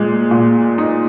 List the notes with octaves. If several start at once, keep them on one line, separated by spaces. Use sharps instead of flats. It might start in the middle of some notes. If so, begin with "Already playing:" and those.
Already playing: A#2 G#3
A#2
D#4